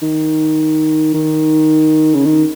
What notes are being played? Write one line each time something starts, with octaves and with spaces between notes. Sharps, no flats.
D#3
D#3
C#3
D#3